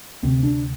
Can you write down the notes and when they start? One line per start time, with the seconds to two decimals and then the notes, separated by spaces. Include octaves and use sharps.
0.23 D2 C3 C4
0.43 D4